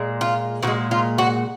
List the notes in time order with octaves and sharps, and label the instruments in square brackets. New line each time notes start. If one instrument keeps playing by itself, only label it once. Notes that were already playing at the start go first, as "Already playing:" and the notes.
Already playing: [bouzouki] A#2 G#3
F4
A#2 F3 F#4
G#3
F4
F#4